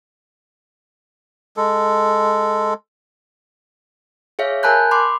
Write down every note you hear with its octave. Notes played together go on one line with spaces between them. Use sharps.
G#3 A4
G#4 C#5 E5 F5
A#4 G#5 A5 B5 F#6 G6
B5 C6 D6